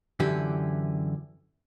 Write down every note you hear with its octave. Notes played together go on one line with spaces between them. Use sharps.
F#2 D3 E3 G4